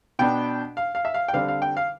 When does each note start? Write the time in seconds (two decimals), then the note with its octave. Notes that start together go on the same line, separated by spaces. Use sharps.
0.19 B2 B3 D4 G5
0.77 F5
0.95 F5
1.05 E5
1.14 F5
1.28 G5
1.33 D3 G3 C4 F5
1.48 F5
1.62 G5
1.77 F5